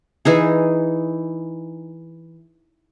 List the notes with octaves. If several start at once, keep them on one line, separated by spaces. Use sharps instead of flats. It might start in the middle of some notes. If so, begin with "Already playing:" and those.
E3 D#4 G#4